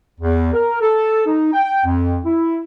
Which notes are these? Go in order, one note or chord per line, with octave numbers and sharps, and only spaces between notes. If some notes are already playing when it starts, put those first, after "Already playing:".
E2
A#4
A4
D#4
G5
F2
E4